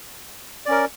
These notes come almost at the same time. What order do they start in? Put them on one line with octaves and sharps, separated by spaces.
D5 C#4 A#4